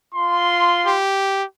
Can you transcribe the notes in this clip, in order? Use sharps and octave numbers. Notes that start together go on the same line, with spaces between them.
F4 C6
G4